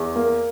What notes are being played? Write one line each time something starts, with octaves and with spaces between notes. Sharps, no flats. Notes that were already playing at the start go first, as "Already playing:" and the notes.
Already playing: E2
A#3